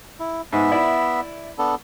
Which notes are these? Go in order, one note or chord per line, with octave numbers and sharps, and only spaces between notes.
E4
G#2 B3 E5
E4 D5
B3 D4 A4